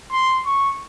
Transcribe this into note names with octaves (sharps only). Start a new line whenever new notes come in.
C6
C#6